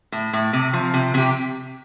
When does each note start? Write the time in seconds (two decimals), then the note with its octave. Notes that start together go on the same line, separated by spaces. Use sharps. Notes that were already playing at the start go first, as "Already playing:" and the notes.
0.12 A2
0.33 A2
0.53 C3
0.73 F3
0.94 C3
1.14 C3 G4